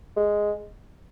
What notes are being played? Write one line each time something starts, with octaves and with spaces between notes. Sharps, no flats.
G#3